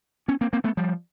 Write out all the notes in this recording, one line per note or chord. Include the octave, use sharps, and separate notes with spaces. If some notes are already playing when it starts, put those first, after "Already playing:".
B3 C#4
A#3 C4
A#3 C4
A3 B3
F3 G3